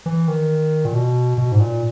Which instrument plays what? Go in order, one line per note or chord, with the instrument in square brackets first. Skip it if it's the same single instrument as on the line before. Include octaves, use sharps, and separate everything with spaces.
[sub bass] E3
D#3
A#2
B2
B2
G#2
A#2